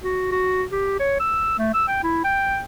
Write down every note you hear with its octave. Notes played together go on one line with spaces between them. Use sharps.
F#4
F#4
G4
C#5
E6
A3
E6
G5
E4
G5